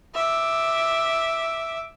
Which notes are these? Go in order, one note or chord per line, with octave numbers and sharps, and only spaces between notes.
E5 D6